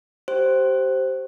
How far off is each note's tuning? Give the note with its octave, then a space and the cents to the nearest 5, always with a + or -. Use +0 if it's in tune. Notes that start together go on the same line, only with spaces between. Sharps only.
G4 -25 C5 +0